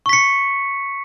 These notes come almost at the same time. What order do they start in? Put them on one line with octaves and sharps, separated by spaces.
C#6 B6 C#7